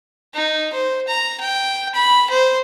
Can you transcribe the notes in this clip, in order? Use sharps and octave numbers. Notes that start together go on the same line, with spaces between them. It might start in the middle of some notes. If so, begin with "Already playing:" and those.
D#4
C5
A#5
G5
B5
C5